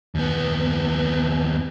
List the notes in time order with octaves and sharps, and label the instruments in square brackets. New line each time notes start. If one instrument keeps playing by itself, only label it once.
[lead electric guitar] D#2 B3